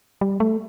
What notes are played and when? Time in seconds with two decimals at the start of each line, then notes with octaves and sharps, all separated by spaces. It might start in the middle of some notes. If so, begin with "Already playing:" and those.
0.21 G3
0.40 A3